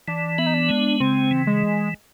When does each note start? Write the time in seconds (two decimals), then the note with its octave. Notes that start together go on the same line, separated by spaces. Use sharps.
0.08 E3 D4
0.38 B3 E4
0.46 D#4
0.54 D4
0.69 G#3
1.00 C#3 C4
1.31 E3
1.47 G#3